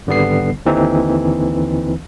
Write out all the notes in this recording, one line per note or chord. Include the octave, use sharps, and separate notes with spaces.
G#1 D3 G3 B3 C7
D#2 D3 E3 C4 D#4